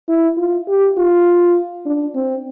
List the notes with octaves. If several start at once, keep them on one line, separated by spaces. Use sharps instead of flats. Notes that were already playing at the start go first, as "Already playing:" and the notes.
E4
F4
G4
F4
D4
C4